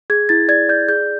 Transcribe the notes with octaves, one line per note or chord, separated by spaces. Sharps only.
G#4 G#6
E4 A6
D5 G#6
D5 G6
G#4 G6